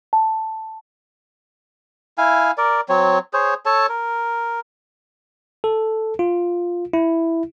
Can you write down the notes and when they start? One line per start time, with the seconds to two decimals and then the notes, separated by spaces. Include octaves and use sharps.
0.13 A5
2.18 E4 F5 G#5
2.58 A#4 D5
2.89 F#3 C4 C#5
3.33 G#4 C5 C#5
3.66 A4 C#5 A5
3.89 A#4
5.64 A4
6.19 F4
6.93 E4